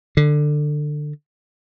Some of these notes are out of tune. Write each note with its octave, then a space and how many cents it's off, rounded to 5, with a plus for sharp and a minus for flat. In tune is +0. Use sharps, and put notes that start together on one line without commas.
D3 +20